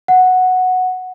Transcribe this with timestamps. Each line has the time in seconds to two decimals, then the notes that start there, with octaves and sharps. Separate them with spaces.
0.08 F#5